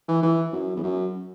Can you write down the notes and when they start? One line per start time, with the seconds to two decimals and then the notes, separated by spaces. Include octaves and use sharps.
0.08 E3
0.23 E3
0.53 F#2
0.76 E2
0.84 F#2